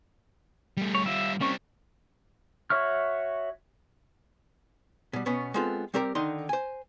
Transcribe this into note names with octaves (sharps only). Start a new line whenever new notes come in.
G3 A3
C#5
G3 F4 E5
G3 A#3 C4 C#4 C#6
F#4 C#5 E5 C#6 F6
B2 G3
B2 B3 C#4
G#3 B3 C4 F4 A4
G3 C4 G4 A#4
D3 D#3 D#4 C6
C5 G#5